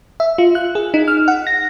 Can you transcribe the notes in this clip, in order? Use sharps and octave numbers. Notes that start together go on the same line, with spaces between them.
E5
F4
F#6
G#4
D#4
F6
F#5
A#6